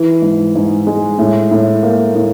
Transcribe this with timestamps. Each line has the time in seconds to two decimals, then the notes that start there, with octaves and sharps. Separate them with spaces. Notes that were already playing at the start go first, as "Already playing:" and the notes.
Already playing: E3
0.22 G#2
0.55 G#2
0.87 G#3
1.18 A2
1.51 A2
1.83 A#3
2.15 A2